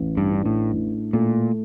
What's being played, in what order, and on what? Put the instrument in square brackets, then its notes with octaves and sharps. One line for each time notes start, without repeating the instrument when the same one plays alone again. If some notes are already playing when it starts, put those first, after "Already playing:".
Already playing: [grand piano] A1
[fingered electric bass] G2
[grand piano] D4
[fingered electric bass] A2
[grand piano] A2
[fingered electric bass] A#2 [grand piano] A3